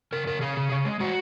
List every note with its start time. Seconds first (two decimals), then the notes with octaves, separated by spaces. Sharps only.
0.13 C#3 A#4
0.27 C#3 A#4
0.41 C#3 G#4
0.57 C#3
0.72 C#3
0.85 G#3
1.00 G#3 F#4